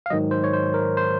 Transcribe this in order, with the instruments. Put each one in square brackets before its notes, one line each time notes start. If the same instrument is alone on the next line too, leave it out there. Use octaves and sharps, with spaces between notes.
[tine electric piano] F5
G#2 D#3 F#3 D#5
C5
C#5
C5
A#4
C5